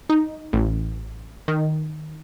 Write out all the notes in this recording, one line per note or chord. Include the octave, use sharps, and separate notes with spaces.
D#4
A1
D#3